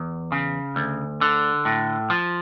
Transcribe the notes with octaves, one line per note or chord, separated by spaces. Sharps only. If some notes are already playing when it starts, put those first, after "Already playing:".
Already playing: E2
C#3
D2
D3
A2
F3